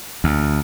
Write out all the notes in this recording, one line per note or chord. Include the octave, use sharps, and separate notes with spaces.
D2